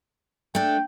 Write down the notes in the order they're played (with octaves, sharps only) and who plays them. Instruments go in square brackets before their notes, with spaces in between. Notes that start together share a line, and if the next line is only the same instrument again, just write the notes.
[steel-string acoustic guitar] A3 D4 [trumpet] G5